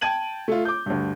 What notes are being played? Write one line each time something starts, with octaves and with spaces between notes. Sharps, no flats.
G5 A5 G#6 D#7 F#7
A3 F4
D6 G6
D2 G2